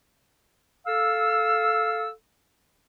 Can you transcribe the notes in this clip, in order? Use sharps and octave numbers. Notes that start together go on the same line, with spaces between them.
A4 F5 E6